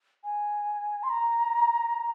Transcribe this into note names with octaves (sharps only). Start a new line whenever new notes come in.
G#5
C6
A#5